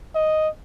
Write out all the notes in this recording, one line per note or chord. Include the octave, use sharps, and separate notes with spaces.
D#5